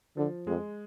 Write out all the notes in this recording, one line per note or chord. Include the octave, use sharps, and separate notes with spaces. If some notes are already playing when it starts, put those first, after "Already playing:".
D3 F3
F2 G#3